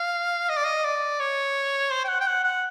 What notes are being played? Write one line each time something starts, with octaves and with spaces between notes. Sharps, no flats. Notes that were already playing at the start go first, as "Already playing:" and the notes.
Already playing: F5
D#5
D5
D#5
D5
C#5
C5
G5
F#5
G5
F#5
F#5